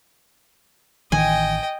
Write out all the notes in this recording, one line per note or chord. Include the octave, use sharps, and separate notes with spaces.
A1 D#3 E3 D#5 G5 G#5